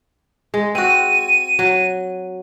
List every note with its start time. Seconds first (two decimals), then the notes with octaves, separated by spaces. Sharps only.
0.54 G#3
0.75 C4 F#4 D#7
1.59 F#3